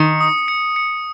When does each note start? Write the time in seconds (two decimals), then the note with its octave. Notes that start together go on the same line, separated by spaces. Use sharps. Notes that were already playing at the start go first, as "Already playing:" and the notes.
Already playing: D#3 C#7
0.21 D#6
0.48 C#7
0.76 C#7